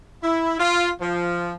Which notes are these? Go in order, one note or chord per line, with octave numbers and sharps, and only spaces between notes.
E4
F4
F3